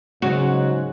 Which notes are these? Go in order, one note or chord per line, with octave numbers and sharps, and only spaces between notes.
G#2 C#3 F#3 G#3 F#4